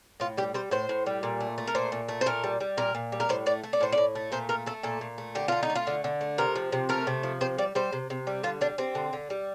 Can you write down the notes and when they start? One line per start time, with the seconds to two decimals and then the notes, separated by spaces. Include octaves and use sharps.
0.20 A2 F4
0.37 G3 G4
0.54 G3 C5
0.71 A2 C5
0.89 A2
1.06 G3
1.23 A#2
1.40 A3
1.58 A3
1.67 A#4
1.75 A#2 C5
1.92 A#2
2.08 A3
2.21 C5
2.26 A#2 A#4
2.44 G3
2.60 G3
2.77 A#2 A#4
2.95 A#2
3.12 G3
3.20 A#4
3.29 A2 C5
3.46 A3 D5
3.63 A3
3.73 D5
3.81 A2 C5
3.92 D5
3.98 A2
4.15 A3
4.32 A#2 C5
4.49 A3 A#4
4.66 A3 A4
4.83 A#2 A4
5.01 A#2
5.18 A3
5.35 D3 G4
5.48 A3 F4
5.63 D#4
5.70 A3
5.75 F4
5.87 D3
6.04 D3
6.21 A3
6.38 C3 A#4
6.55 F3
6.72 C3
6.89 A3 A#4
7.07 C3
7.23 F3
7.41 C3 C5
7.58 G3 D5
7.75 G3 C5
7.93 C3
8.10 C3
8.27 G3
8.43 D3 F4
8.61 G3 D4
8.78 G3 C4
8.95 D3
9.13 D3
9.30 G3